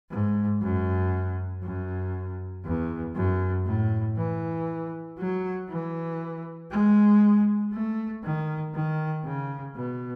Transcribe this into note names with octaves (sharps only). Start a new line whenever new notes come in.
G#2
F#2
F#2
E2
F#2
A2
E3
F#3
E3
G#3
A3
D#3
D#3
C#3
B2